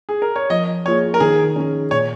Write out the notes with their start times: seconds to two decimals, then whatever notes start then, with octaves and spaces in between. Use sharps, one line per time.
0.09 G#4
0.22 A#4
0.36 C#5
0.50 F3 D#5
0.85 A#3 F4 G#4 C#5
1.14 A#4
1.20 D#3 G#4
1.56 C#4 G#4
1.91 A#2 C#5